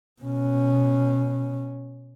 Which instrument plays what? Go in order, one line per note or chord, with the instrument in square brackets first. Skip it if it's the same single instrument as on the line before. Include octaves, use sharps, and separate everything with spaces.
[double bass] B2 C#4